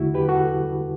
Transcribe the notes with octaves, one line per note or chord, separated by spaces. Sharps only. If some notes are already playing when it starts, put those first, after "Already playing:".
Already playing: E2 D3 A3 E4 F#4
G4 B4
F#4 A4